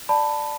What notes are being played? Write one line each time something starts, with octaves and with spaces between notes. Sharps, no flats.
D5 A5 B5